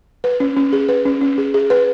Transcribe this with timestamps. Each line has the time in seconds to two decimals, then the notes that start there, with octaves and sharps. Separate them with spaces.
0.24 B4
0.40 C#4
0.56 C#4
0.73 G#4
0.89 B4
1.06 C#4
1.21 C#4
1.38 G#4
1.54 G#4
1.70 B4